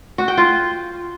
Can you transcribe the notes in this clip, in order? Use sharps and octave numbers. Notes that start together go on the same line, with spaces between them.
F#4
G5
F4